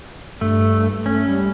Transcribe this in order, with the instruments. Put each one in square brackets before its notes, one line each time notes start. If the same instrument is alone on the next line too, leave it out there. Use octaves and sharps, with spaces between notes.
[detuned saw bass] G2 [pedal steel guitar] A3
[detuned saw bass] A3 [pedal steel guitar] C#4
[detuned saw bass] G3